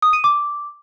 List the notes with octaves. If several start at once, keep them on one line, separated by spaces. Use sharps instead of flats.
D#6
D#7
D6